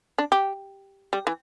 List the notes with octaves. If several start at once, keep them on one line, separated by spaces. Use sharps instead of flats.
D4
G4
G3
E3